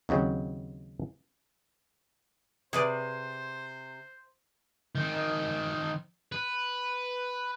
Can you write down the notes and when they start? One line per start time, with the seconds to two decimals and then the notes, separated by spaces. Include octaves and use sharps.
0.09 D#2 C#3 F#3 C4
2.73 C3 G#4 B4 C5 D5
4.95 D#3 C4
6.32 B4